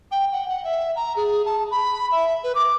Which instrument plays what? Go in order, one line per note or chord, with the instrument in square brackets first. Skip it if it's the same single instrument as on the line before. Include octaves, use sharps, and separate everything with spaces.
[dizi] G5
F#5
F#5
E5
A#5
G#4
A5
B5
E5
B4
D6